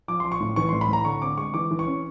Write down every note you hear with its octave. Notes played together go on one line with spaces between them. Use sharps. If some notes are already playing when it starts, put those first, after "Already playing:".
F3 D6
F3 C6
C#6
A2
E3 C#6
A2 C6
B5
A2 A#5
D3 C#6
C4 D6
G#3 C#6
E3 D6
E3
C#6
C#4